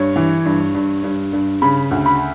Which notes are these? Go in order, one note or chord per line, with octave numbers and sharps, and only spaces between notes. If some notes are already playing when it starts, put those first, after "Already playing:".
Already playing: G2 C#5
E3
G2
G2
G2
G2
C#3 B5
D2
B5